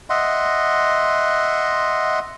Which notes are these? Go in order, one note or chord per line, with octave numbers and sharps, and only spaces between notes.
D#5 E5 F#5 C6